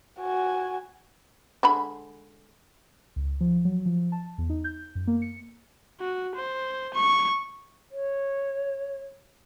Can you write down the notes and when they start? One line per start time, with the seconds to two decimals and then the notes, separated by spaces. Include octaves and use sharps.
0.19 F#4 G#5
1.63 D3 G#3 B5
3.16 C#2
3.41 F3
3.65 F#3
3.86 F3
4.12 A5
4.38 E2
4.50 D#4
4.64 G6
4.95 F#2
5.07 A#3
5.22 C#7
6.00 F#4
6.36 C5
6.94 C#6
7.91 C#5